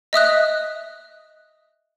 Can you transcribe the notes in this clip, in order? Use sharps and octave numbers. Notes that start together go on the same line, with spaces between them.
D#5 E5 D#6 F#6